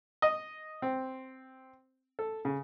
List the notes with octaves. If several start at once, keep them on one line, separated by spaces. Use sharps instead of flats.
D#5
C4
A4
C#3